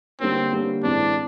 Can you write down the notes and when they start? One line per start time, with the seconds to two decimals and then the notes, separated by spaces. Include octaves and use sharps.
0.20 D3 G3 A#3 C4 C#4
0.51 D3 G3 A#3 C#4
0.83 A2 E3 G#3 C4 D4